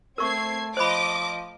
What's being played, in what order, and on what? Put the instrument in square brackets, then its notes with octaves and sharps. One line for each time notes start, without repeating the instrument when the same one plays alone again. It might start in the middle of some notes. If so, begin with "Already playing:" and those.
[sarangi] A3 [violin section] C4 G#6 C7 [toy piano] A#4 C#6
[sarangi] F3 [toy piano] C5 B5 [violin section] D#5 D6